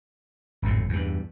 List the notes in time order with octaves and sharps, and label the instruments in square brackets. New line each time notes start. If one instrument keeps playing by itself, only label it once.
[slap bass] G#1 F2 A2
E2 G2